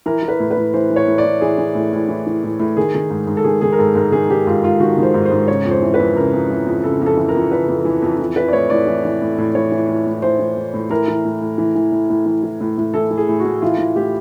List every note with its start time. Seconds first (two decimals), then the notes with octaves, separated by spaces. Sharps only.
0.06 E3 A#4
0.23 E3
0.28 B4
0.40 A2
0.51 B4
0.57 A2
0.74 E3 C5
0.90 E3
0.96 C#5
1.07 A2
1.18 D5
1.24 A2
1.41 E3 G#4
1.58 E3
1.75 A2
1.93 A2
2.09 E3
2.27 E3
2.43 A2
2.59 A2
2.77 D#3 G#4
2.95 D#3
3.10 G#2
3.27 G#2
3.37 A4
3.44 D#3 G#4
3.61 D#3 G#4
3.73 A#4
3.79 G#2 A4
3.95 G#2 A#4
4.12 D#3 G#4
4.29 D#3 G4
4.47 G#2 F4
4.63 G#2 F4
4.80 D#3 F#4
4.97 D#3
5.03 C5
5.14 G#2
5.26 C5
5.32 G#2
5.48 C#3 C#5
5.65 F2
5.71 C5
5.82 E3
5.94 B4
5.99 F2
6.17 C#3 A#4
6.33 F2
6.50 E3
6.66 F2
6.84 C#3 A4
7.01 F2
7.06 A4
7.17 E3
7.29 A#4
7.35 F2
7.52 C#3 B4
7.68 F2
7.85 E3
8.02 F2
8.19 E3
8.36 E3 B4
8.48 D5
8.53 A2 C#5
8.70 A2 D5
8.87 E3
9.05 E3
9.22 A2
9.38 A2
9.55 E3 C#5
9.72 E3
9.88 A2
10.07 A2
10.22 E3 C5
10.39 E3
10.57 A2
10.74 A2
10.90 E3 A#4
11.08 E3
11.25 A2
11.41 A2
11.58 E3
11.75 E3
11.92 A2
12.10 A2
12.26 E3
12.43 E3
12.61 A2
12.78 A2
12.94 E3 A4
13.11 E3
13.17 G#4
13.28 A2
13.39 F#4
13.45 A2
13.62 E3 F4
13.78 E3
13.96 A2 G4